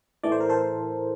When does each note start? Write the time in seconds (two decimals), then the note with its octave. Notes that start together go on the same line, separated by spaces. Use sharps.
0.23 A2 E3 A3 D5
0.32 C5
0.40 A#4
0.49 A4 C5